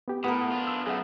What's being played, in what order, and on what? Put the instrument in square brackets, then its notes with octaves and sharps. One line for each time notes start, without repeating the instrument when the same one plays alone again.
[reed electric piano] B3 G4
[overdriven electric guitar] A2 [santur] B3 A#4 [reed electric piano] B5 D#6
[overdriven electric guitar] D4 F4
[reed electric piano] E6
[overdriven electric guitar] F#2 A3 [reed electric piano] G#4 F#5